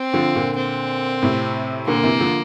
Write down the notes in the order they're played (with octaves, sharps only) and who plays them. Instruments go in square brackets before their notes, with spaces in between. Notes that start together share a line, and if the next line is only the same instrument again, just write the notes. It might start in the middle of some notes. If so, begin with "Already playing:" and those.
Already playing: [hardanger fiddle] C4
[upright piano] D3 F3
A#2 D3
[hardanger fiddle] C4
[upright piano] A2 C3
[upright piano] A#2 D3 [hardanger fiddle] A#3
[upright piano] C3 E3
D3 F3